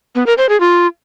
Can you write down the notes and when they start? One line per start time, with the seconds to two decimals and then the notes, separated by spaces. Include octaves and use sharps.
0.15 B3
0.27 A#4
0.38 C5
0.49 G#4
0.60 F4